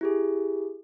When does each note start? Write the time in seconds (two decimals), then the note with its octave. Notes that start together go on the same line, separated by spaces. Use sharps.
0.01 E4 G4 G#4